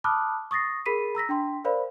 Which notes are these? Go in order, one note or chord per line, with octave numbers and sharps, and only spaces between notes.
A5 B5 D6 D#6 F6 F#6
C#6 D#6 A6 A#6 C7
G#4 A#4 B5 B6 C7 D#7
A#5 E6 A#6 B6
D4 G5 C6
A#4 C5 D5 F5 B5